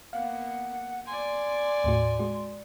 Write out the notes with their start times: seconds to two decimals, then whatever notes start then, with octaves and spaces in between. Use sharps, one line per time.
0.13 A#3 B3 F5 F#5
1.07 D5 G#5 C6
1.84 D#2 A2 F#4
2.19 G#3 F#4